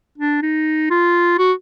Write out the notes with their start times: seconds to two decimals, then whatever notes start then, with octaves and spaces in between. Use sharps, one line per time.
0.18 D4
0.42 D#4
0.90 F4
1.38 F#4